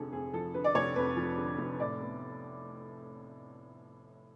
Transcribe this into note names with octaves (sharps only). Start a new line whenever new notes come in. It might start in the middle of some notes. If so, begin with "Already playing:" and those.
Already playing: F1 F2 D3 F3 G#4 A4
F2 G#4
F3 A4
D3 B4
D5
F1 C#5
F2 B4
F3
D3
F1
A2 D5
B3